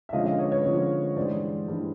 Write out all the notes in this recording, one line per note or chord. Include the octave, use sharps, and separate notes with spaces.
E5
D3 F3 G#3 C#4 D#5 F5
D#5 F5
C#5 D#5
B4 C#5
D3 F3 G#3 C#4
G2 E3 G#3 C5 D5
G2 E3 G#3